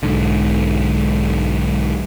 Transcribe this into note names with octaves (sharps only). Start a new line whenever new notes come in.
B1 G#2 D3